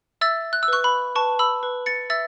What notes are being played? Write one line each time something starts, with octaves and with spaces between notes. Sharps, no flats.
E5 E6 A6
F#6
E6
B4 C#6 F#6
B5
B4 A5 C#6
B5 E6
B4
A6 C#7
E5 E6 A6